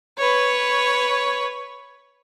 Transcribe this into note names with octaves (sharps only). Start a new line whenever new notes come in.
B4 C#5